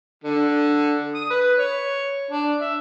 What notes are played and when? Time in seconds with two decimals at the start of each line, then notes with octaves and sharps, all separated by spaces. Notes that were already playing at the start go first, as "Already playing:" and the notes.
0.24 D3
1.15 D#6
1.30 B4
1.59 C#5
2.31 D4
2.61 E5